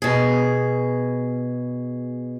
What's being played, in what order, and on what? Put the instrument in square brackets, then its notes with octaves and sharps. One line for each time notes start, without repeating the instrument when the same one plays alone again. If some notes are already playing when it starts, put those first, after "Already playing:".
[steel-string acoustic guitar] B2 G#4